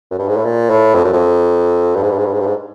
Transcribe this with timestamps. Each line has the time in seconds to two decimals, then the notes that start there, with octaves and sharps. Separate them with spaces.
0.11 F#2
0.18 G2
0.28 G#2
0.37 A2
0.45 A#2
0.70 A2
0.95 F2
1.04 F#2
1.13 F2
1.95 G2
2.03 G#2
2.11 G2
2.18 G#2
2.26 G2
2.33 G#2
2.40 G2
2.47 G#2